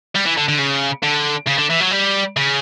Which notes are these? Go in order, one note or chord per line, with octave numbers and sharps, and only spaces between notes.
G3
E3
D3
D3
C#3
D3
C#3
D3
E3
F#3
G3
C#3